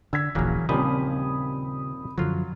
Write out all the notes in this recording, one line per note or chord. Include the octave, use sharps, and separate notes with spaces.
D3 E6 G#6 B6
D#1 A#1 C#3 E3 F#3 A#3
D#2 A#2 C#3 F3 G3 C4 B5 D#6
F#2 D3 F3 F#3 F4